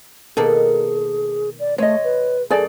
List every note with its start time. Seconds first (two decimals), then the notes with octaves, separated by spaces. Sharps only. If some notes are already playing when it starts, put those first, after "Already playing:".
0.37 B2 D#3 A#3 G#4 A4
1.59 D5
1.78 G#3 A3 C#5 D#5
2.04 B4
2.50 F#2 A3 G#4 A4 D5